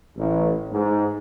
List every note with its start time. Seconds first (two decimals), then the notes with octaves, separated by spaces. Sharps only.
0.17 A1
0.71 G#2